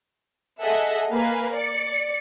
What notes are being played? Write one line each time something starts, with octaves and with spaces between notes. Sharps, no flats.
G#4 A4 D#5 E5 F#5
A#3 B4 F5 G#5
D5 C#7